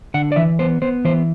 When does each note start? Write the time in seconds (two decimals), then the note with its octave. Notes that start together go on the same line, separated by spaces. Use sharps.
0.14 D3 F#5
0.32 D5
0.36 E3 E5
0.59 B3 C5
0.82 B3 C5
1.05 E3 C5